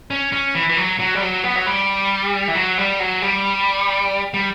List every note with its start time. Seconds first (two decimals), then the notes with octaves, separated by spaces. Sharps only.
0.10 C#4
0.32 C#4
0.55 E3
0.69 E3
0.77 F#3
0.99 F#3
1.15 G3
1.22 F#3
1.44 B3
1.56 F#3
1.66 G3
2.48 E3
2.55 F#3
2.78 G3
3.00 F#3
3.22 G3
4.34 G3